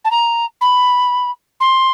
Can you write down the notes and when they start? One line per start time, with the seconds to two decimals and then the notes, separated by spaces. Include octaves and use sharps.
0.05 A5
0.11 A#5
0.61 B5
1.60 C6